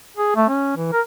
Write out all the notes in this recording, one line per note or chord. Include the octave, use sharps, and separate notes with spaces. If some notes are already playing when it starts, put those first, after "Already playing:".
G#4
A3
C#4
E3
A#4